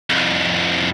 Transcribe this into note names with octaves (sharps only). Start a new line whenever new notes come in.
C2 F2